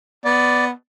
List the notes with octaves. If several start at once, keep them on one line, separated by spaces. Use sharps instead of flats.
B3 D5